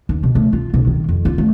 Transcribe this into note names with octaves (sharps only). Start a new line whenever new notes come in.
D#2
B2
A3
F4
B1
D#3
F2
F4
A3